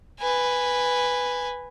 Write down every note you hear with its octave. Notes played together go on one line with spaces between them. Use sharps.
B4 G#5